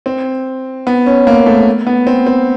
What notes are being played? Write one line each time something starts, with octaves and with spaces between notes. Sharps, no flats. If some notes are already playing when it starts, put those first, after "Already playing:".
C4
B3
C#4
A#3
A3
B3
C4
C4